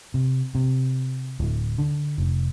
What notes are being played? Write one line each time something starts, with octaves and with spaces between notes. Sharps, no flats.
C3
C3
D1
D3
F1